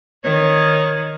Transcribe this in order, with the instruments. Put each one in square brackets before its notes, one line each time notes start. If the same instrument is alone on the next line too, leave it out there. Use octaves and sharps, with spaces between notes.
[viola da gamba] D#3 [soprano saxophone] C#5